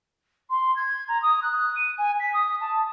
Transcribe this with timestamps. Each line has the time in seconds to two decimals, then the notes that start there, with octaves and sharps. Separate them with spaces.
0.50 C6
0.76 G#6
1.08 A#5
1.22 D#6
1.42 F#6
1.76 D#7
1.98 G#5
2.20 B6
2.33 D#6
2.60 A5